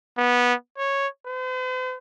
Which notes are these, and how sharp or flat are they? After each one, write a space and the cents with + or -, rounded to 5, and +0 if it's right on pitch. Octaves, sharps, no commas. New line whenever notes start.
B3 -15
C#5 -5
C5 -45